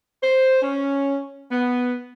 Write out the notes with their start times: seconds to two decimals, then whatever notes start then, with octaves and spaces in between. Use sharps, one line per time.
0.23 C5
0.62 C#4
1.51 B3